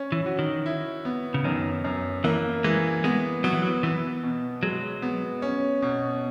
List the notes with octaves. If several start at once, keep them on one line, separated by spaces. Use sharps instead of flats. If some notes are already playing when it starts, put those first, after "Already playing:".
Already playing: C#4
E3
F#4
D#3
E4
B3
C#3
F#2 D#3
F#2
E3 A#3
E3 G#3
G#3 B3
F#3 B3
E3
F#3
E3 B3
B2
F#3 G#3
B3
C#4
B2